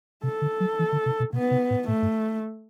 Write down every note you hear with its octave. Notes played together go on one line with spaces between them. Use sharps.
C3 A4
D3
F#3
E3
D3
C3
B2
B2 B3
C3
A2
A2 A3
G2